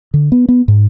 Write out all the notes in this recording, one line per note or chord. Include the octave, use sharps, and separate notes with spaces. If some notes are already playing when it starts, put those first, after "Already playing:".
D3
B3
B3
G#2